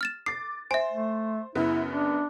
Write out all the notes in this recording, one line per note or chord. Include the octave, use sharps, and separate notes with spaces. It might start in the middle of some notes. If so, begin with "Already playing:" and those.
F6 A6 E7
D6 A6 C7
C5 E5 G#5
A3
F#2 C#3 B3 E4
D4